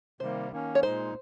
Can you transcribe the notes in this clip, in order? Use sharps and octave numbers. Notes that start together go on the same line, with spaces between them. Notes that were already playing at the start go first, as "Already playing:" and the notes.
C3 D#3 G3 A#3 C5
D#3 A#3 C#4
C#5
A#2 G#3 D#4 C5